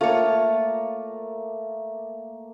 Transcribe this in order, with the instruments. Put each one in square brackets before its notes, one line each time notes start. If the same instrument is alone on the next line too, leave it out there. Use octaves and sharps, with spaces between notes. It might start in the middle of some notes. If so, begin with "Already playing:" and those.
[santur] A3 A#3 [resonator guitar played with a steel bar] F4 C#5